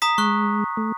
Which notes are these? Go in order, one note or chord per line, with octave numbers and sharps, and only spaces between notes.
A#5 D#6 B6
G#3 C#6 F#6
A3